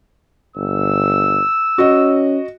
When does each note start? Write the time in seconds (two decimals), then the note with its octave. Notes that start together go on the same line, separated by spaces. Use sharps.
0.56 G1 E6
1.78 C#4 F#4 D#5